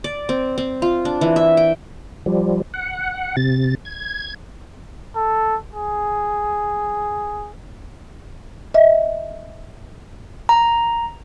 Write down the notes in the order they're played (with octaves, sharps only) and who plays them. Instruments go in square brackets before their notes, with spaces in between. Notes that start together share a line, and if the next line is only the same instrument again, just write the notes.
[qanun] D5
C4
C4
F4
D4
E3
E5
G5
[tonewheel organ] F3 G3
F#5
C3 A6
G#6
[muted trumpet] A4
G#4
[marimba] D#5 E5
[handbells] A#5